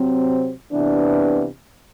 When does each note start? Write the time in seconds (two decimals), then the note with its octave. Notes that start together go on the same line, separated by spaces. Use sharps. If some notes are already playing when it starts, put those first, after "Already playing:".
Already playing: C3 F#3 C4
0.71 C3 E3 B3 D4